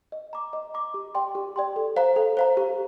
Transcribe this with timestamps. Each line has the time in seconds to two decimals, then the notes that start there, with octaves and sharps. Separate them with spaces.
0.12 D#5
0.33 A#5 D6
0.53 D#5
0.74 A#5 D6
0.94 G4
1.15 D5 G5 C6
1.35 G4
1.56 D5 G5 C6
1.76 A4
1.96 C5 F5 A#5
2.16 A4
2.37 C5 F5 A#5
2.57 G4